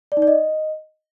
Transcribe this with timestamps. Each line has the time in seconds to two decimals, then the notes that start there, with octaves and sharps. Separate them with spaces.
0.12 D5
0.17 D#4
0.22 D5
0.27 D#5